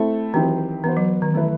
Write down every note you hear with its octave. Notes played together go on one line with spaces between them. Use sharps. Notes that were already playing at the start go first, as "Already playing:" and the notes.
Already playing: A3 C4 E4 A4
D#3 E3 F#3 C4 E4 G4
E3 B3 F#4 C5
F#3
D#3
E3 A3 E4 B4 E5